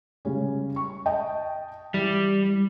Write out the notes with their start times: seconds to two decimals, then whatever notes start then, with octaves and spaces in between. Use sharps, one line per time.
0.25 C#3 G3 C#4
0.76 C#6
1.06 D#5 G5 A5
1.94 E3 G3